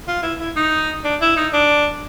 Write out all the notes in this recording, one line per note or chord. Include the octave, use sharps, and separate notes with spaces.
F4
E4
E4
D#4
D4
E4
D#4
D4